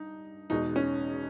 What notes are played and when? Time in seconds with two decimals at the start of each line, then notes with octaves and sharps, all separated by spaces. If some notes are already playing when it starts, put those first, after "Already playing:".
Already playing: G2 D#4
0.50 E2 B2 G#3 D#4
0.76 C#4